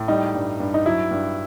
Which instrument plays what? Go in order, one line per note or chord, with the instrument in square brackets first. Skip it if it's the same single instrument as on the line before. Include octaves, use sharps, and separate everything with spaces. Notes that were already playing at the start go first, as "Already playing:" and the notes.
Already playing: [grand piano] A2
G3 D#4
G2
G2
D#4
F#3 E4
G2